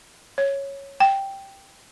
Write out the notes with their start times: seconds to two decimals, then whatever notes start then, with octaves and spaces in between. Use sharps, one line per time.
0.38 C#5
1.00 G5